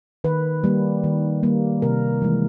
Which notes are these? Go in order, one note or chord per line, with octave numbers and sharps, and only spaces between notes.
D#3 B4
G3 A#3
D#3
G3 A#3
C3 A#4
E3 G#3